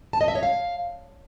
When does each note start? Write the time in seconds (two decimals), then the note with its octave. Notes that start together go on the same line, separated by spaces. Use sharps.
0.13 A5
0.21 D#5
0.28 E5
0.35 C#5
0.43 F5